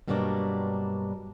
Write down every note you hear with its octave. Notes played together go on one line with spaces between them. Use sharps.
G2 B2 F#3 G3 A#3 D4